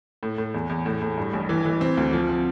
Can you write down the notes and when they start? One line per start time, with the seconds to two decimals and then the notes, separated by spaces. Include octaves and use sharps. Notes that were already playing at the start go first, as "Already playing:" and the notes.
0.23 A2
0.38 A2
0.54 E2
0.69 E2
0.86 A2
1.02 A2
1.18 G2
1.33 A1
1.49 E3
1.65 E3
1.81 C4
1.97 D2
2.13 F3
2.29 C4